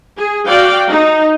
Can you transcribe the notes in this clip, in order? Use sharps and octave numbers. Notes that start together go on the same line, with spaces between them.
G#4
F#4 D5 F5 G5
D#4